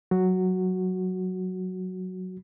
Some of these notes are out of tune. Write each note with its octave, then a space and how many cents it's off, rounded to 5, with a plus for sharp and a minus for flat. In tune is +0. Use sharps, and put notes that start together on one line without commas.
F#3 +0 F#4 +0